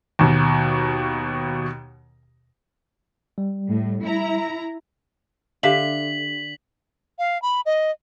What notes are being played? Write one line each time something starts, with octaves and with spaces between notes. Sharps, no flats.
D#2 B2
G3
A2
E4 A#5
D3 G4 E5 F5 B6 F#7
F5
B5
D#5